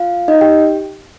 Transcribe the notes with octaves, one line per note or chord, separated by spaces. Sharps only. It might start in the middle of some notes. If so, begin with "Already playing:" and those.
Already playing: F4 F5
D#4 D#5
G4 G5